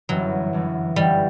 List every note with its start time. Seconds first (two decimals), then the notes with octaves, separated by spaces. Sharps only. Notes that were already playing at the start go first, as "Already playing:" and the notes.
0.09 G1 F#2 E3 F#3
0.53 G1 F#2 E3
0.96 G1 F#2 E3 G3